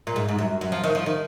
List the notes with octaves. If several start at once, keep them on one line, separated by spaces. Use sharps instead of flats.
A#2
G#2
G#2
F#2
F#2
F3
D#3
F3
D#3